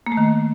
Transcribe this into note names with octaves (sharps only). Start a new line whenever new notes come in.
A#3
A3
D#3